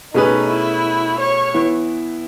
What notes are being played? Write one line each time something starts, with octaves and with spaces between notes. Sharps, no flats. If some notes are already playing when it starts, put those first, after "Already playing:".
B2 A3 C#4 D#4 G#4 B4
E4
C#5
E3 B3 E4